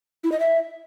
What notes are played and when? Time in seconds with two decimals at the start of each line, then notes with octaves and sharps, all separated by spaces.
0.24 E4
0.32 D#5
0.40 E5